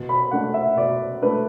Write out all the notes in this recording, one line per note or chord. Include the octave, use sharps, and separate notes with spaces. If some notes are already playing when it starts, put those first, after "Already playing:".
Already playing: B2
B5
A3 D4 F#5
E5
B2 D5
A3 D4 B4